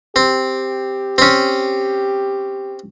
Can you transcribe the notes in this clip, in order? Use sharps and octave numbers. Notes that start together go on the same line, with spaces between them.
C4 G4
C4 C#4